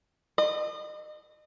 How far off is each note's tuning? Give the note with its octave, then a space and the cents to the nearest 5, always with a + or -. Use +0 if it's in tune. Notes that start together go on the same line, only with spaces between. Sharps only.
D#5 -35